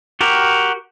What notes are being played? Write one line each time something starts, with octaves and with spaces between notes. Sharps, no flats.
F#4 G4 A#4